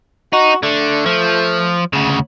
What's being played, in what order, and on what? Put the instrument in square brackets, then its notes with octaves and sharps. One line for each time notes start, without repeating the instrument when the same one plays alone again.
[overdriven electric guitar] D#4 [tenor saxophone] F#4
[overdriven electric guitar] D3 [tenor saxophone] A3
[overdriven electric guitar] F3
D2 C#3